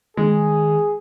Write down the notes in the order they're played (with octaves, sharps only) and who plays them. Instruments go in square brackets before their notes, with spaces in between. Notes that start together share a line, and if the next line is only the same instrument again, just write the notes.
[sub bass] D#3 [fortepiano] G#3 [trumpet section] G#4